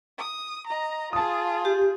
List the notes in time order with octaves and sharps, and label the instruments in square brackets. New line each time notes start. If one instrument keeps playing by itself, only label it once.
[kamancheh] D#6
D#5 A#5
[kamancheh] F4 G#4 [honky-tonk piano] A5 D#6
[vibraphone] G4